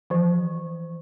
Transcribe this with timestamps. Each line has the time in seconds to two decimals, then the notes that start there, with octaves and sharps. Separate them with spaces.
0.10 E3 F3